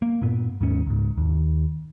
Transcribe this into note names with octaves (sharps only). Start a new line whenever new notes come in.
A#3
G2 A#2 B3
D#2 G#2 C#4
C#2 G#2
D#2